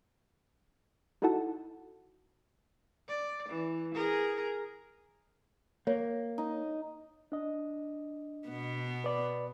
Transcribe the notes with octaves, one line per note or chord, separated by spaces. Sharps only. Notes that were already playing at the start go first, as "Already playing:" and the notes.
D#4 E4 F#4 A4 F#5 A5
D5
E3
G#4 A#4
A#3 C#5
D#4
D4 D#5
B2 B3
B4 D5 B5